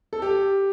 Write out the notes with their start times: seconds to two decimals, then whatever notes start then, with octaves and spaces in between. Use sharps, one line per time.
0.13 A4
0.22 G4